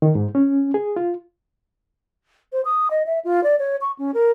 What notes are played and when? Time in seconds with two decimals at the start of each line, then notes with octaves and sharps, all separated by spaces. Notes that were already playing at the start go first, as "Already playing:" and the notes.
0.02 D#3
0.15 G#2
0.35 C#4
0.74 G#4
0.96 F4
2.53 C5
2.65 D#6
2.91 D#5
3.06 E5
3.25 F4
3.44 D5
3.59 C#5
3.81 C#6
3.99 C#4
4.14 A#4